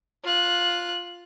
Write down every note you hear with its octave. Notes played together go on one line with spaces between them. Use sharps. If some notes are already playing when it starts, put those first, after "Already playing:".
F4 F#6